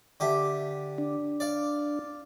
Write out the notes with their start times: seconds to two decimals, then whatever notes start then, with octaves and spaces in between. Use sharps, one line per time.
0.20 D3 G4 E5
0.98 D4
1.40 D5 F5